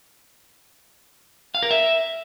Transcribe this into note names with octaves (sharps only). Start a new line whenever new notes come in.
F5
A#4
E5